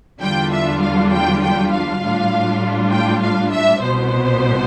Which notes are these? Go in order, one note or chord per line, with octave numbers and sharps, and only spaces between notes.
E2 D3 G3 D4 F4 G5
E5
F5
G5
G5
F5
A2 G3 D4 F4
G5
F5
E5
C2 B2 B3 C5